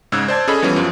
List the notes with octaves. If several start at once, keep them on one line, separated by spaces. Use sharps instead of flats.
G#2 C#3 E6 F#6 G#6
C5 D5 A5 G#6
C#4 G#4 A4 D#5 B5
E3 F3 G3 B3 C#4
F#2 F3